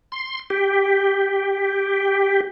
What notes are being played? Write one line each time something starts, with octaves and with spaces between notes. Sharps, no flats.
C6
G4